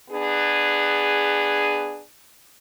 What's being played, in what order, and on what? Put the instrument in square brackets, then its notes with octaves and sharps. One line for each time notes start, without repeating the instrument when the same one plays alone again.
[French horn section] B3 D4 G#4